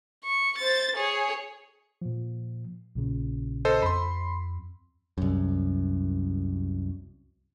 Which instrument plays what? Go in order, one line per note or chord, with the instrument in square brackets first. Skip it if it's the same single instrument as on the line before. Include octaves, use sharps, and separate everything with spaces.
[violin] C#6
C5 A6
G#4 C#5
[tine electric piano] A#2 F3
A#1 A#2 C#3
[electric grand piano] A4 C5 D#5
[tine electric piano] F2 [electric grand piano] B5 C6
[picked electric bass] C2 F#2